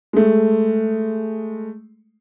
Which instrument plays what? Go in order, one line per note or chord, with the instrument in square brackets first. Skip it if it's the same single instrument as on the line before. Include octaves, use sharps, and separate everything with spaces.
[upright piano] G#3 A3